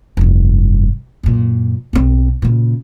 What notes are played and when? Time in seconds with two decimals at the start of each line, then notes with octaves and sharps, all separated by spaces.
0.17 F1 G2
1.23 F#2 A#2
1.93 B1 C4
2.42 A#2 C#3